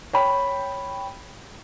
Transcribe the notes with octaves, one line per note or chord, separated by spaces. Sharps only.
C#5 G5 B5